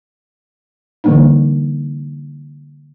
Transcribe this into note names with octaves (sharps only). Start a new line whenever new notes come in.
D3 E3 G3 A#3 D4 D#4